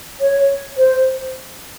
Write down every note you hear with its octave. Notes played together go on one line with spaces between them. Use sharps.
C#5
C5